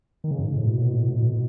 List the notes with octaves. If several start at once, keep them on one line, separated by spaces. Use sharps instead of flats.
D#3
C#3
F#2
G#2
A2
B2
A2
B2
A2
B2
A2
B2
A2
B2